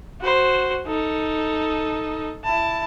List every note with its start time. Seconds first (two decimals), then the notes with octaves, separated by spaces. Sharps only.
0.21 F#4 C5
0.87 D#4 A4
2.44 E4 A5